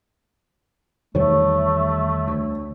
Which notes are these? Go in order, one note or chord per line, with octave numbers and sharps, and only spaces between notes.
E2 D#3 G3 A3 C#5
D2